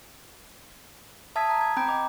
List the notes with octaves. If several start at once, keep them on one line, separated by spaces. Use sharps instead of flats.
E5 A5 D#6 E6 G#6 B6
A#5
G#6
C4 G5 A#5 B5 G6 D7
D#5 G5 D6